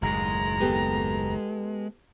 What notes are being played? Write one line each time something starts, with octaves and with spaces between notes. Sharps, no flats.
F#1 D#2 A2 G#3 A#5
B3 G4 A4